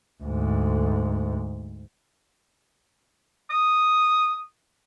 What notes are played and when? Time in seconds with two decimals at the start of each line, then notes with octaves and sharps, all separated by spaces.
0.23 D2 G#2
3.50 D#6